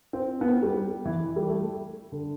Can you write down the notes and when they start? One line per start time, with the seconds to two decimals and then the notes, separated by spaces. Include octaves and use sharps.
0.13 C4
0.41 B3
0.63 G3
1.05 E3
1.36 G3
1.48 A3
2.12 D3